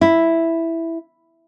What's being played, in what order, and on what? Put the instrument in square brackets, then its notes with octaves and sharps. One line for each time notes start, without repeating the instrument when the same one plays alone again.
[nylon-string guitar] E4